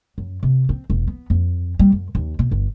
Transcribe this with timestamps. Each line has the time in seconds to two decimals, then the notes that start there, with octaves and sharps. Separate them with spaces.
0.18 F#2
0.43 C3
0.69 C4
0.90 E1
1.07 B3
1.30 F2
1.79 G3
1.92 F#2
2.15 D#2
2.39 B2
2.51 G1